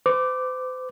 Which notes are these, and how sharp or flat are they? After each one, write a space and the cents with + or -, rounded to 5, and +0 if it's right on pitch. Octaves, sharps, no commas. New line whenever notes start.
C5 -40 D6 +0